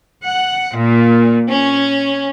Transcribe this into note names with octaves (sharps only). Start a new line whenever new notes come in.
F#5
A#2
C#4